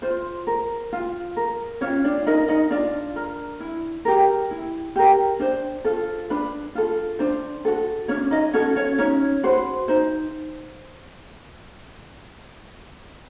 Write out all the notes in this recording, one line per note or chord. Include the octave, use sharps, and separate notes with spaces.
F4 C5
A#4
F4
A#4
C#4 F4 C#5
D4 D5
D#4 A#4 D#5
D#4 D#5
D4 F4 D5
A#4
E4
G4 A#4
E4
G4 A#4
D4 C5
F4 A4
D4 B4
F4 A4
D4 C5
F#4 A4
C#4 D4 C#5
D#4 D#5
C#4 F#4 A4 C#5
C#4 C#5
C#4 D#4 C#5
F#4 B4 C5
D#4 C5